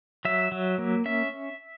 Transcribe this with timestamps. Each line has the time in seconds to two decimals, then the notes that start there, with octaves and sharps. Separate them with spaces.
0.25 F#3 E5
0.52 F#3
0.78 A#3
1.05 C#4 E5